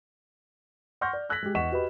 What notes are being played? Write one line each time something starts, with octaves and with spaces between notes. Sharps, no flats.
F#5 C6 C#6 F6 G6 A#6
D5
E6 F#6 G#6 A#6 B6 F#7
G#3 G4
E2 D#5 F#5 C#6 B6 E7
F#4 G4 B4 D#5 B5